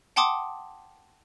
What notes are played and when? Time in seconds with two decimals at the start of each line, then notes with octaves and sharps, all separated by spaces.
0.16 F#5 G5 A5 C6 D6 D#6